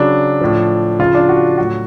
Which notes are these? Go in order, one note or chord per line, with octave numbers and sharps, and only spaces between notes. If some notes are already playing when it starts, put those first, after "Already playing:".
Already playing: C#3 F#3 D4
A2 F3
C#3 F3 F4
D4
F#4
A2 F#3 F#4